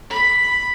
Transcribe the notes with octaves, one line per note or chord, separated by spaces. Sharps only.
B5